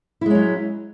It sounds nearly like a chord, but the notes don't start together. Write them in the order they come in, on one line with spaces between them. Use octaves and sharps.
E4 G#3 C#4 F#3